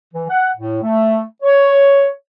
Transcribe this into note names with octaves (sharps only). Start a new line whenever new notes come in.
E3
F#5
A2
A3
C#5